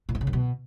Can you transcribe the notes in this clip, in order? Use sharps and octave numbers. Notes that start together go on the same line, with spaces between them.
A#2
G#2
C#3
F#2
B2